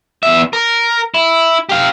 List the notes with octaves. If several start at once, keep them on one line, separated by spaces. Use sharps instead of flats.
E2 E5
A#4
E4
G4 F5